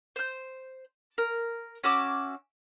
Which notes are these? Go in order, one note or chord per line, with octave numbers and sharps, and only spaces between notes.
C5 G6
A#4
C#4 F#4 E5 D6